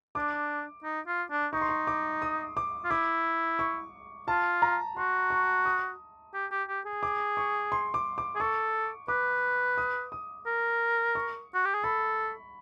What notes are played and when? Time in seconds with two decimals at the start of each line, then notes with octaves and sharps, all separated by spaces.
0.15 D4 D6
0.84 D#4
1.07 F4
1.31 D4
1.53 D#4 C#6
1.61 C6
1.69 C#6
1.87 D6
2.22 D#6
2.57 D6
2.84 F4
2.90 E4 D6
3.59 C#6
4.28 F4 A5
4.62 A#5
4.97 F#4 C6
5.30 C#6
5.65 D#6
6.34 G4
6.51 G4
6.68 G4
6.86 G#4
7.03 D6
7.37 C#6
7.72 C6
7.94 D6
8.18 D6
8.35 G#4
8.40 A4 C#6
9.08 B4 D6
9.78 D#6
10.12 D#6
10.46 A#4
11.15 C#6
11.54 F#4
11.65 G4
11.74 G#4
11.84 A4 B5